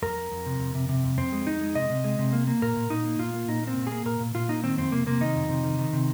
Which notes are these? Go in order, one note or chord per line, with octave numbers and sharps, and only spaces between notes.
F2 A#4
F2
F2
C3
F2
C3
C3
F2
F2 C4
G#3
F2 D#4
G#3
C3 D#5
C3
G#3
C3
A#3
A#3
A#2 A#4
A#2
A#2 D#4
A#3
A#2 F4
A#3
A#2 D#4
A#3 C4
A#2
A#3 G#4
A#2 A#4
A#2
A#2 F4
A#3 D#4
D#3 C4
F2 C4
C3 A#3
C3 A#3
D#3 D#4
F2
C3
D#3
D#3
C3